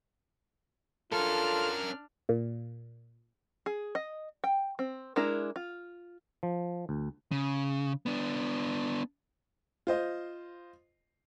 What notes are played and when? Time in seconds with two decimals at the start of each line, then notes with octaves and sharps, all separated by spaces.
1.12 C#4 D4 F4 A4 A#4 F6
2.29 A#2
3.66 G#4
3.95 D#5
4.44 G5
4.79 C4
5.16 G#3 D4 E4 A#4
5.56 F4
6.43 F3
6.89 D2
7.32 C#3
8.06 B3 D4
9.87 F4 C5 D#5